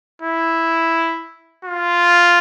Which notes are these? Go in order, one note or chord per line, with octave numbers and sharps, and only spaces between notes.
E4
F4